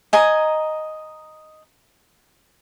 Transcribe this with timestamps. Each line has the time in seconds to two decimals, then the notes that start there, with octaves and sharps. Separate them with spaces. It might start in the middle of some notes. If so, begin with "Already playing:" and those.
0.13 D#5 G#5 A#5